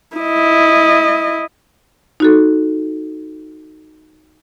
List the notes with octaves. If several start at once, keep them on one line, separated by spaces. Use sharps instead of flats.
E4 D#5
D#4 F#4 A4